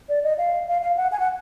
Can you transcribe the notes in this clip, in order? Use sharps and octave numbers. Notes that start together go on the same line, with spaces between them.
D5
D#5
F5
F5
F5
F#5
G#5
F#5